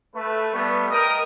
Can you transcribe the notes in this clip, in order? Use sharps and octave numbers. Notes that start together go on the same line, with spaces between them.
A3 B4
G3 A3 B3
A#4 D#5 G5 D#6